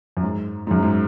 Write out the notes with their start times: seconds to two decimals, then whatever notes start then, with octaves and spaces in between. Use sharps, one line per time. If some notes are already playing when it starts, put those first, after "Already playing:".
0.17 F#2
0.23 G#2
0.67 G#2
0.71 F#2
0.83 G#2